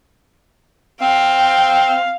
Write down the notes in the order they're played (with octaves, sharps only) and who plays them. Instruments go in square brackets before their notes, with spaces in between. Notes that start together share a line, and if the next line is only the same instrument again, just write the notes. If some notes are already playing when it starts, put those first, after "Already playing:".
[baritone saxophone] C4 [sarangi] F5 [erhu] G5